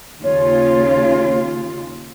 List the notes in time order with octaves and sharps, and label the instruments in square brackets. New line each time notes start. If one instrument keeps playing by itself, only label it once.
[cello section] D#2 C#3 F4 [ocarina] C#5